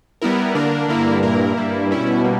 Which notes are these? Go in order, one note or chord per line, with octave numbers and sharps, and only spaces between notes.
G3 B3 E4 A#4
D3 A#3 D4 A#4
G2 D3 A#3 E4 A#4
A#2 A#3 E4 A#4
G2 G3 A#3 E4
B2 G3 C#4 E4
G3 A#3